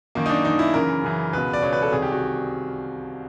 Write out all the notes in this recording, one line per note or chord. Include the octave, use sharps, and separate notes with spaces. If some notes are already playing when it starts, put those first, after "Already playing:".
F#2 D#3 A#3
D#4
D4
F#2 D#3 D#4
E4
F#2 C#3 E3 A#4
F#2 C#3 E3
C#2 B2 B4
D5
C#2 B2 C#5
B4
A4
C2 C3 D#3 G#4
G4
F#4